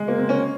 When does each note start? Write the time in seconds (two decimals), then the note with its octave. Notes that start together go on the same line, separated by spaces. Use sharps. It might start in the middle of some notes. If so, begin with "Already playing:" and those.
Already playing: G#3
0.08 A#3
0.18 C4
0.29 C#4